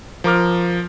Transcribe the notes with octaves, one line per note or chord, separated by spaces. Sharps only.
F3 A#4 D6 F6